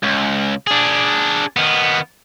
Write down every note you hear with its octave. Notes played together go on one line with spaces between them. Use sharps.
C#2
D4 G#4
D#3 B3